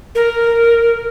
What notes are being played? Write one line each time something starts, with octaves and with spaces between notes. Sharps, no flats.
A#4